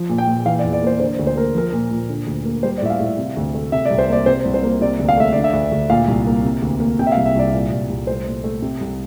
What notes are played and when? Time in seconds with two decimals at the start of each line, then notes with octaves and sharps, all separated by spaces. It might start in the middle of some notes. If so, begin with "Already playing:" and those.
Already playing: F3
0.09 A#2
0.18 G5
0.27 A#2
0.45 E3 F5
0.59 D5
0.64 E2
0.73 D5
0.83 A#3 C5
1.00 D3 C5
1.19 D2
1.27 C5
1.36 A#3 A#4
1.54 F3 A#4
1.73 A#2
1.91 A#2
2.09 D3
2.27 D2
2.45 A#3
2.63 G3 C5
2.78 D5
2.82 A2 E5
2.90 F5
3.00 A2 E5
3.18 C3
3.37 D2
3.55 A3
3.72 C3 E5
3.85 C2 D5
3.99 C5
4.09 A#3 D5
4.26 C3 C5
4.45 C2
4.54 C5
4.63 A#3
4.81 C3 D5
4.99 D2
5.09 F5
5.17 A3 E5
5.33 D3 D5
5.44 E5
5.53 D2
5.72 D2
5.90 A#2 F5
6.08 C2
6.27 A#3
6.44 C3
6.62 D2
6.80 A#3
6.99 C3 G5
7.07 E5
7.12 F5
7.17 C2
7.25 E5
7.35 C2 D5
7.53 A#2
7.71 C2
7.89 C2
8.07 A3 C5
8.26 A#2
8.44 A3
8.62 C3
8.81 C2